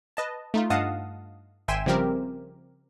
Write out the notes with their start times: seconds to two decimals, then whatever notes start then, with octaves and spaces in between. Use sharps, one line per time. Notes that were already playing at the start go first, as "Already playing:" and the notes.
0.17 B4 D#5 A5
0.54 A3 D#4 F4
0.70 G2 D#5 F5 F#5 A5 D#6
1.68 G#1 E5 G5 G#5 C6 E7
1.86 C#3 F3 G3 C4 G4 A#4